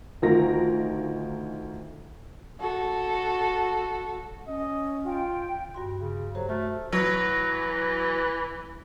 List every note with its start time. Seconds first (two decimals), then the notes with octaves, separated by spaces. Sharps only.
0.22 D2 D#3 F4 A#4 A#6
2.60 F#4 A4
4.47 C#4 D#5
5.05 F4 G5
5.74 G2 F#4 C6
6.00 C#3
6.35 F#3 G4 A4 C5
6.49 A3 F#4 F6
6.92 E3 F#3